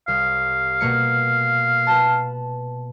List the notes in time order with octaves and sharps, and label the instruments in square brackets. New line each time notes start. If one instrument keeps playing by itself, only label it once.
[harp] C2 [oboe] F5
[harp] B2 A#3 C#7
B4 A5